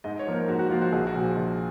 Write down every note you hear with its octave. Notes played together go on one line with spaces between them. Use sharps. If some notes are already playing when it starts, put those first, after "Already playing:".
G#2 D#5
C#5
F3 A#3
A#4
G#2 F#4
F#4
F3 A#3 F4
F#4
A#1 G#4
F#4
A#2 F3
G#4
A#1